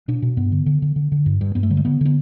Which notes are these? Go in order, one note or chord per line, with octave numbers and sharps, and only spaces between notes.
B2 D4
B2
G2 B3
D3
D3
D3
D3
D3
G2
G2
G2 B3
A3
D3 G3
A3
D3 B3
D3 B3